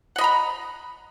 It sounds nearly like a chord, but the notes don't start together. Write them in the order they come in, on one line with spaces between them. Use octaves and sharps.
F#5 D#5 B5 A#5